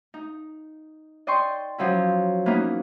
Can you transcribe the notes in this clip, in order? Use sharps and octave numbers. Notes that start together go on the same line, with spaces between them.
D#4
D5 D#5 G5 C6 C#6
F3 F#3 C#4 E4
E3 A#3 B3 C#4 D#4